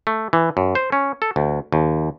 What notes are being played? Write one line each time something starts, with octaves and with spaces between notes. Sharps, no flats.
A3
E3
F#2
C5
C#4
A4
D2
D#2